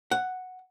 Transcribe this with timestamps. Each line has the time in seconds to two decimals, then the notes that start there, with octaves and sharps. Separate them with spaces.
0.11 F#5